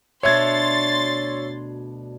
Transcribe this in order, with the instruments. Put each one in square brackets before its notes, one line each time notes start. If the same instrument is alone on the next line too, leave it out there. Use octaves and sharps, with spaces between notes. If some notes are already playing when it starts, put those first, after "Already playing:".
[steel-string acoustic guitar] D2 B2 D4 [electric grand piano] C#5 E5 G#6 [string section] C6 A6